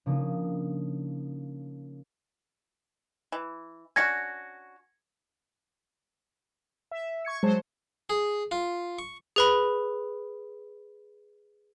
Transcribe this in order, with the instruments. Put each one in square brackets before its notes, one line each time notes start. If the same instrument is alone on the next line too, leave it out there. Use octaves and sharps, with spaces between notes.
[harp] C#3 F3 A#3 D4 D#4 D#6
[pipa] E3
[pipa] C#4 D4 F#4 [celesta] G#6 A#6 C#7
[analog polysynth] E5
C#6 G#6 C#7
[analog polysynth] F#3 C5 A5 [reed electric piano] G#3
[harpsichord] G#4
F4
C#6
[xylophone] G#4 B4 B5